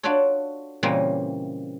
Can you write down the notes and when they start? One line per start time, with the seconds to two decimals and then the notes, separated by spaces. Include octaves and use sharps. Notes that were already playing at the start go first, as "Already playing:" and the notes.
0.03 D4 F4 F#4 A4 C#5
0.83 A#2 C#3 E3 G3 A#3 C4